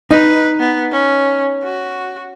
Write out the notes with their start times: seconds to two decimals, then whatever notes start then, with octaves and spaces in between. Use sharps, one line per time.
0.11 D#4 B4
0.60 B3
0.92 C#4
1.64 F#4